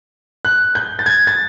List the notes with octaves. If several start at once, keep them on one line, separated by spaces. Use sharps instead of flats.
F#6
G6
A6
G#6
A6